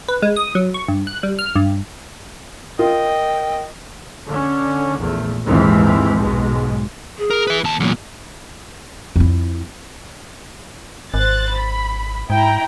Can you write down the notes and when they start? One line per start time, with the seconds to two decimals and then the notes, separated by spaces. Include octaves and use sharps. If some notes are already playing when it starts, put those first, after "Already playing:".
0.08 B4
0.22 G#3
0.36 D#6
0.55 F#3
0.74 C#6
0.88 G2
1.07 F#6
1.23 G3
1.39 F6
1.55 G2
2.79 F4 A#4 D#5 G5
4.28 D3 C#4
4.98 A#1 E2 A3
5.45 F1 A#1 D#2 G#2 E3 C4
6.19 B1 G#2 B2 G#3
7.18 G#4
7.30 A#4
7.47 B4 E5
7.64 D#2 A5
7.80 E2 A#2 F#3
9.16 F2 E4
11.14 G#1 C5 F#6 A6
11.54 B5
12.30 G#2 E4 G5 A#5